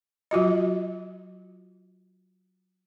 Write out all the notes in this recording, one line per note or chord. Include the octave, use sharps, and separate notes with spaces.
F#3 F4 F#4 D#5